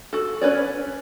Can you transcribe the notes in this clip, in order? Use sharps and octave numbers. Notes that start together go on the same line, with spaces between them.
F#4 A4
C#4 B4 C#5 D5